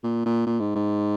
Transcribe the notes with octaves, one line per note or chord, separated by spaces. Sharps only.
A#2
A#2
A#2
G#2
G#2